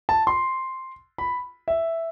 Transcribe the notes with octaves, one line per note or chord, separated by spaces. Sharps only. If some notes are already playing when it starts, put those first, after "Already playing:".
A5
C6
B5
E5